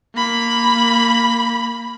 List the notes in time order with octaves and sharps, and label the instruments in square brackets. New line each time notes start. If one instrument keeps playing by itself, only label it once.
[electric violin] A#3 B5